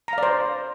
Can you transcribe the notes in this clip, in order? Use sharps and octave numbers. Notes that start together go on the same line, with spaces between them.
C5 D5 F5 A#5